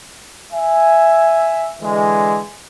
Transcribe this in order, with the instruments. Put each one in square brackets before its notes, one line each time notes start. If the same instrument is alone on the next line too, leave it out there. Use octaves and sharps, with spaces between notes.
[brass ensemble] E5 G#5
D3 E3 G#3